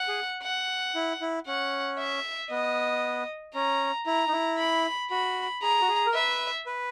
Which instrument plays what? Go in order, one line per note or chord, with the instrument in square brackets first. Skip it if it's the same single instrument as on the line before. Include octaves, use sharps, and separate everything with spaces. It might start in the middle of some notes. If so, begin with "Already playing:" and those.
Already playing: [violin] F#5
[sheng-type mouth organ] G#4
[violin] F#5
[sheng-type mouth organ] E4
E4
[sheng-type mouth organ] C#4 [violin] F#5
[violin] E5
[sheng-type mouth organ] B3 [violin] D#5
[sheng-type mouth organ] C#4 [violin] A#5
[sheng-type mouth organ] E4 [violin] A#5
[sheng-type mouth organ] D#4
E4
[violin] B5
[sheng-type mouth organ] F#4 [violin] B5
[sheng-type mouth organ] G#4 [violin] A#5
[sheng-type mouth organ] F#4
G#4
A#4
[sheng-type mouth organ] B4 [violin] E5
[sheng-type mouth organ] B4